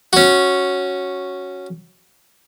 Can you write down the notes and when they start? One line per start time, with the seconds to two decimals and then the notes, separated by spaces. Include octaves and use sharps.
0.13 C#4 F#4